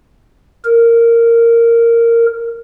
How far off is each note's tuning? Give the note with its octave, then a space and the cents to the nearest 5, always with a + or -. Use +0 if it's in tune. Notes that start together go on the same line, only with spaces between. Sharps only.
A#4 -10